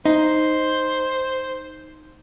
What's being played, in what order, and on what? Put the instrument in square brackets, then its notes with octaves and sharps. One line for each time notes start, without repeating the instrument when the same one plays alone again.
[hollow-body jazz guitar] D#4 [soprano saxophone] C5